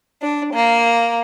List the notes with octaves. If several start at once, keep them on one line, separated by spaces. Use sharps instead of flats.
D4
A#3